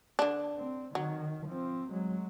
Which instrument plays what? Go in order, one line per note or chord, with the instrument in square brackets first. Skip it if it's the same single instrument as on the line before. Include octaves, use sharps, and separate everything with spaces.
[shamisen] D3 D4
[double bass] C4
[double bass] D#3 [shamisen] F#3
[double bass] F3 C4
F#3 G#3